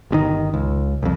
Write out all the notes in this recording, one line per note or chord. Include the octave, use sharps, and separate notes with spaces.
G1 B2 D#3
C#2
C2 F2